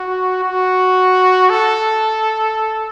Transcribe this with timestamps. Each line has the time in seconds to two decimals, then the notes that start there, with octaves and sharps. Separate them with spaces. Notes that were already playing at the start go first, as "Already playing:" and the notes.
Already playing: F#4
0.43 F#4
1.50 A4